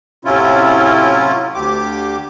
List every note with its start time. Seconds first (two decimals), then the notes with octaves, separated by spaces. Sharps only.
0.25 A2 C3 F#3 C#4 E4 F4
1.55 D2 G4 D6